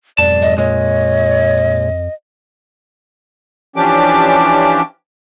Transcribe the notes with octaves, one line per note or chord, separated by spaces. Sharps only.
B1 F2 G#2 D5 A5
D#5
A#2 G#3 C#5 D#5
E3 F3 C#4 D4 G4 D6